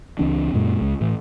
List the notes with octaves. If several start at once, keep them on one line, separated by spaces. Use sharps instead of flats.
C#2 E3 C4 D4
F#2 A#2 G#3 A#3
C#2 G#3
A2 E3